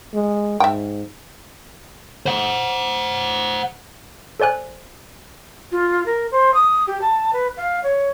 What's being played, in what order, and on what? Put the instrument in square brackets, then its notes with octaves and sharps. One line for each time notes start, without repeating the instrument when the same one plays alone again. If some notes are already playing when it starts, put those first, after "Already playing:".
[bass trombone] G#3
[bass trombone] G#2 [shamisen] E5 G5
[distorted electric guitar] C5 F#5
[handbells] A4 C5 D5 G#5 F#6
[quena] F4
A#4
C5
D#6
G4
A5
B4
F5
C#5